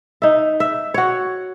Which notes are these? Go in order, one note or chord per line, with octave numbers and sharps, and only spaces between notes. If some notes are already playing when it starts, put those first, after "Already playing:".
D#4 E5
E5
F#4 C#5